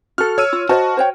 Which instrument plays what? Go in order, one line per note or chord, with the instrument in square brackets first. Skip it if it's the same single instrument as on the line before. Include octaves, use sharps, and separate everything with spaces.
[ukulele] F#4 A4 [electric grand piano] F6
[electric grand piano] C#5 E6 D#7
[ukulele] F4
[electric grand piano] F#4 [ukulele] C5 D#5 A5
[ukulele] C5 C#5 G5